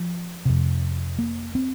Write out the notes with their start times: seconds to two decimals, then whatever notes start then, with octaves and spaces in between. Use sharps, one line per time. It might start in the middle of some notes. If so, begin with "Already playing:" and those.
Already playing: F3
0.45 F2 C3
1.18 A#3
1.55 C4